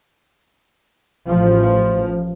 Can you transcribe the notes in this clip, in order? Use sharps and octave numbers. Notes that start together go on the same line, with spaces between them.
A1 F3